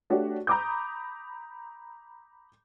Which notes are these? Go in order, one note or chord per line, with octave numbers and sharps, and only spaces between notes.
A3 D4 F#4 G4 C#5
A#5 B5 D6 D#6 G6